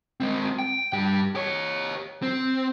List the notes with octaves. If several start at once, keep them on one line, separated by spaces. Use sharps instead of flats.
G#3 C4
G5
G2 G4
G4 C#5
C4